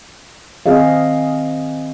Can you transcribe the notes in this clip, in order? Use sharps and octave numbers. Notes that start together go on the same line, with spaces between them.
D#3 C4 G#4 D#5 F5